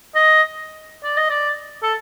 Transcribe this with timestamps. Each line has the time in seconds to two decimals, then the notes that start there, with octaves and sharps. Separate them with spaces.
0.15 D#5
1.04 D5
1.17 D#5
1.30 D5
1.83 A4